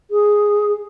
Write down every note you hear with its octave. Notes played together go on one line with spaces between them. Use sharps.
G#4